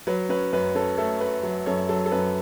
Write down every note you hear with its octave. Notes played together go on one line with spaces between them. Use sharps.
F#3 B4
C#4 B4
F#2 B4
C#4 A4
A3 A4
A3 B4
F#3
F#2 A4 C#5
F#3 A4
A4
F#2 B4